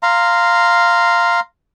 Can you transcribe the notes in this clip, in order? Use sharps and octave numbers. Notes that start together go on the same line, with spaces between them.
F5 A#5 C6